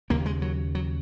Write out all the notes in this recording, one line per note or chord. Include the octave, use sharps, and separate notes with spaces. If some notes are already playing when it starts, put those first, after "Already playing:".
D#2 C#3 A#3
G#3
F#3
F#3